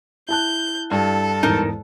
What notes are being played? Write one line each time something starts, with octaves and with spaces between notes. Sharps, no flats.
E4 A5 F#6 G6
G2 A4
E2 G#2 D#4 A#4 A5